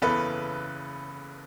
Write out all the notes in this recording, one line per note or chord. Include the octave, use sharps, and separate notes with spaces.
F#1 E2 C#3 E3 A4 B4